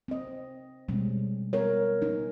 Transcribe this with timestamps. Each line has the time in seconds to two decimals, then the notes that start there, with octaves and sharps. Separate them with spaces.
0.08 C4 D#5
0.88 B2 G3 G#3 C4 C#4
1.53 G3 B3 A#4 C#5
2.02 C#4 D#4